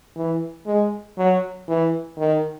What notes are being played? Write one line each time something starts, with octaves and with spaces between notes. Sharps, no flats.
E3
G#3
F#3
E3
D#3